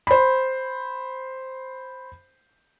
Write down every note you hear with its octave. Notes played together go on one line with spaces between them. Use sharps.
C5 B5